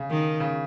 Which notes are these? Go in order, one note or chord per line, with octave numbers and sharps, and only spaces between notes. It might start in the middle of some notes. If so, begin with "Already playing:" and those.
Already playing: C#3
D#3
C#3